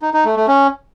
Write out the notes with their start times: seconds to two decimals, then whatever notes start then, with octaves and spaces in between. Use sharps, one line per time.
0.02 D#4
0.13 D#4
0.25 A3
0.36 A3
0.48 C#4